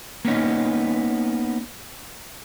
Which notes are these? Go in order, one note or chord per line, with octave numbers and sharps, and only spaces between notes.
A#3 B3 C#4 D#4